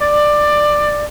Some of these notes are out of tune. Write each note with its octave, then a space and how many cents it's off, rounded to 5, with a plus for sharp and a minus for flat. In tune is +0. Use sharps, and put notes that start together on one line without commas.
D5 +15